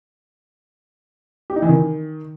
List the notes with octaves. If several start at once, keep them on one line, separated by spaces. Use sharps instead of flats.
G4
D#4
E3
D#3